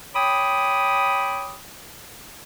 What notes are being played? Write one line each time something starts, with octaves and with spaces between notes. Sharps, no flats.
C#5 G5 B5 D6 D#6